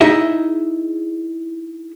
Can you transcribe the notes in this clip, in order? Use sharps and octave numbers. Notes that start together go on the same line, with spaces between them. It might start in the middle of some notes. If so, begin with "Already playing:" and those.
D#4 E4 G#4 D#5 E5